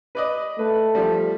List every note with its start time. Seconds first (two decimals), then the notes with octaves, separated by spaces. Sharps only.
0.15 B4 D5 D#5
0.59 A3 B4
0.95 F3 G3